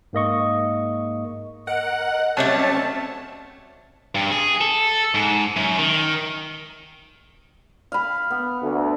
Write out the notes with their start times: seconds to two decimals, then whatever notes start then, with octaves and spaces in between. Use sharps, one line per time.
0.13 G#2 A#3 D#5 C#6
1.67 A#4 D#5 F#5
2.37 F#3 G3 A3 C4 C#4 C#5 A5
4.15 G2
4.31 G#4
4.61 A4
5.14 G#2
5.56 F#2
5.79 D#3
7.92 F5 B5
8.31 B3
8.62 D2